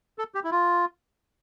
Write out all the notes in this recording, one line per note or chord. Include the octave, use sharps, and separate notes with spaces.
A4
G4
E4
F4